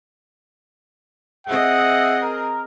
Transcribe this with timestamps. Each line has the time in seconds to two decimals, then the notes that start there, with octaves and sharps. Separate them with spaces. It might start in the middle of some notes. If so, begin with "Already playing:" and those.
1.47 C4 G#4 D#5 E5 F#5
2.21 A#4